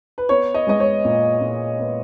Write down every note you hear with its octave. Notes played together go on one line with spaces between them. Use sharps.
B4
B3 C#5
D#5
G#3 D#5
C#5
A#2
A#2
B3